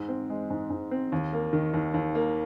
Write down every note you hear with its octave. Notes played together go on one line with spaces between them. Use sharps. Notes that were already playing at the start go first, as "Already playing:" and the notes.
Already playing: G#2
C4
G#3
G#2
G#2
C4
D#2
A#3
D#3
D#2
D#2
A#3